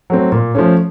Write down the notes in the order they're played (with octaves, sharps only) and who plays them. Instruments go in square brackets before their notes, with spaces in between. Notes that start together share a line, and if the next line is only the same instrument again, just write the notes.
[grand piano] F#3 A3 C4
A#2
F3 A3 C#4